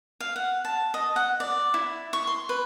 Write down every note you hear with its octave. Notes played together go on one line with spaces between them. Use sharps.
F5
F#5
A5
D#5
F#5
D5
E4
C#6
C6
B4